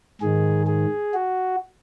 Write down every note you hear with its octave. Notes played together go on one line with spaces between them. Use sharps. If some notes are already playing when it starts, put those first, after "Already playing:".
G#2 D#3 G#4
G#4
F#4